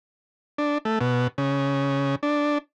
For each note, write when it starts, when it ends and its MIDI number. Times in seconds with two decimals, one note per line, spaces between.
0.58 0.78 62
0.85 0.99 57
1.01 1.27 47
1.38 2.15 49
2.23 2.58 62